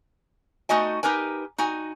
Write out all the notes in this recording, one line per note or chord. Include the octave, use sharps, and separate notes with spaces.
A3 D#4 F#4 D#5 G#5
D#4 G4 A#4 B4 G#5
D#4 F#4 G#5